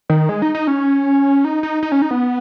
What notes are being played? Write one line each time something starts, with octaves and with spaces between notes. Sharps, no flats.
D#3
G#3
D#4
D#4
C#4
D#4
D#4
D#4
C#4
D#4
B3